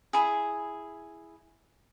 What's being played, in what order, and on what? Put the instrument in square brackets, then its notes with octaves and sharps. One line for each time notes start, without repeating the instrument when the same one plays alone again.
[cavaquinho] E4 G#4